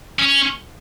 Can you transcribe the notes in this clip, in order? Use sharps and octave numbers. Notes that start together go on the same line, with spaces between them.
C#4